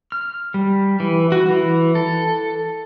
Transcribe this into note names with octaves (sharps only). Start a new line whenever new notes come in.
F6
G3
E3
F#4
E3
A4